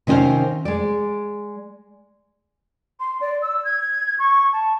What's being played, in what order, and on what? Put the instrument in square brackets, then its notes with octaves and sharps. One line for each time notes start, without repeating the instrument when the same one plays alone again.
[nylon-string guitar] C3 D#3 C#4 F#4 C5 F5
G#3 D5
[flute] C6
D5
E6
G#6
C#6
A5